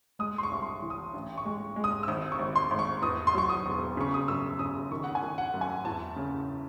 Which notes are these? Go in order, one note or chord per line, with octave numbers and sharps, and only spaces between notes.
G#3 D#6
C6
C#6
C2
C6
C#6
E3
D#6
A1
C#6
G#3
G#3
D#6
E6
G#1 D#6
C#6
G#1
C6
G#1
C#6
E2 D#6
C6
F#3 C#6
D#6
E1
C#3 C#6
D#6
F#2 E6
C#3 D#6
D#3 C#6
F#5
G#5
D#3
F#5
F#2
G#5
E2 A5
C#3